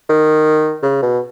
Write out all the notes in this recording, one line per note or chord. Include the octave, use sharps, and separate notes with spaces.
D#3
C#3
B2